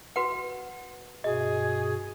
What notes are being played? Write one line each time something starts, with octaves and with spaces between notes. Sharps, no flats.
F#4 B4 F#5
G2 B2 F#4 G#4 D#5